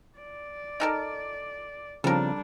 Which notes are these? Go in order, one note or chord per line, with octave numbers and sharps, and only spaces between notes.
D5
D#4 A4 A#4
C#3 F3 G3 C4 D4 A4 A#4